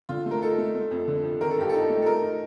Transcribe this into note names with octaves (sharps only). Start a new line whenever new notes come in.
D3 F4
A3
A#4
D#4 A4
A3
A3
F2
D3
F2
D#3 A#4
A4
G2 G4
D#4 A4
A3
A4
A3 A#4
D#4